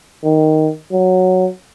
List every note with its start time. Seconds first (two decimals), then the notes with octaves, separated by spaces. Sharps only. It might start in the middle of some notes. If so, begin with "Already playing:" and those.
0.24 D#3
0.92 F#3